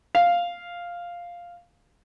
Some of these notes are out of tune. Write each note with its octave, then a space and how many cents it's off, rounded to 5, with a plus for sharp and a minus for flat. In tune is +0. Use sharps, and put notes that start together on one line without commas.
F5 +0